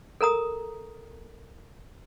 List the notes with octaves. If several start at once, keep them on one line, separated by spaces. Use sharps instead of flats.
A4 A#4 A#5 D#6